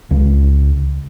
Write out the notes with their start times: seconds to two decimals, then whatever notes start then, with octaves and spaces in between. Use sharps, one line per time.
0.11 C#2